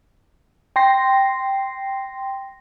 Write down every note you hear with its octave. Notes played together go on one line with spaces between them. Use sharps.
G5 C6 A#6 C7